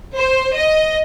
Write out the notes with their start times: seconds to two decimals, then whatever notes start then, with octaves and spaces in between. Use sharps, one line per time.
0.17 C5
0.55 D#5